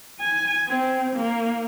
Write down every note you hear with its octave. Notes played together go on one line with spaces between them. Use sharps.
G#5
C4
A#3